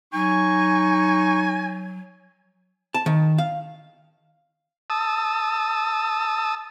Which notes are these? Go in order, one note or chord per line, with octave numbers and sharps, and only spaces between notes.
F#3 D#4 G#5 C#6
A5
D#3
F5
A5 D#6 E6